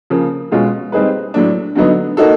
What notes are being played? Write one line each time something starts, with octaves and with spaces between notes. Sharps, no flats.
C#3 F3 A#3
B2 G#3 C#4 F4 G#4
G3 C4 D#4 G#4 B4
A2 F#3 A3 D4
G2 D3 F#3 B3 D#4
A#3 D#4 F#4 A4